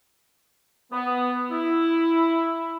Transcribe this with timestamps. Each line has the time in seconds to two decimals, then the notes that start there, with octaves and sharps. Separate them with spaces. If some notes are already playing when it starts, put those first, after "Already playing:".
0.92 B3
1.51 E4